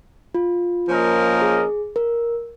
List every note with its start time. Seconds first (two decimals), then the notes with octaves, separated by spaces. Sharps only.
0.35 F4
0.89 F3 A#3 C#4 A#4 D#5
1.42 G#4
1.96 A#4